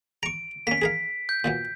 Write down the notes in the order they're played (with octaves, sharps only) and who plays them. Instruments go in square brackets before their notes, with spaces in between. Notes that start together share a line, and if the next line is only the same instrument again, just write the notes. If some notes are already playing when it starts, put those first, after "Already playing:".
[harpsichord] A#5 C#6 [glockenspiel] D7
[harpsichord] A#3 C#4 [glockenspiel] B6
[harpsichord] G#4 A#4 F5
[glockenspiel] G6
[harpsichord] A#2 E3 F#3